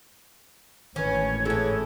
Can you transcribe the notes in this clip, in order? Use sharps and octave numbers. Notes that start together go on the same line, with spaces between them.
G#1 A2 D#3 E3 C#4 B4 C#5
E3 C#4 E4 G#4 A4